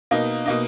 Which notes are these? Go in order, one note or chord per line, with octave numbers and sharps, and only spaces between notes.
B2 A#3 D#4
B2 A#3 D#4